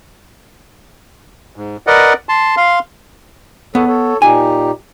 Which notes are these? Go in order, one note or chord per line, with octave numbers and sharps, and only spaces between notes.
G#2
A#4 B4 D5 D#5 F#5
A5 C6
F5 C6
E2 B3 A4 C#5
A4 C#5
A#2 D#4 G4 G#5